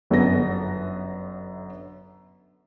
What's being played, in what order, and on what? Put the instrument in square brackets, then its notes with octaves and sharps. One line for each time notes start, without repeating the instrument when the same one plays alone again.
[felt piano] G1 F#2 D3 B3 B4 A#6